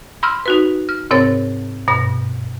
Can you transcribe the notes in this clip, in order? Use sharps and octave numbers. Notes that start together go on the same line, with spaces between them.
B5 C6 E6 F6
D#4 F#4 B4
F6
G#2 C3 C4 A#4 C#5 A6
G2 B2 A#6